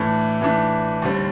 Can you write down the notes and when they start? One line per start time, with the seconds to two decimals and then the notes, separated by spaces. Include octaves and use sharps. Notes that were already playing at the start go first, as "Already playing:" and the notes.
Already playing: A2 E3 A3 D4
0.41 A2 E3 A3 D4
1.02 D#2 D3 G3 C4